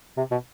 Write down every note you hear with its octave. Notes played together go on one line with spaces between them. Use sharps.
C3
B2